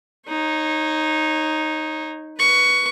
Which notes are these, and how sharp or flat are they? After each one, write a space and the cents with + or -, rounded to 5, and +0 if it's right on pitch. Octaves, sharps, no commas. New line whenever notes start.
D#4 +0 C#5 -30
B4 +0 C#6 +15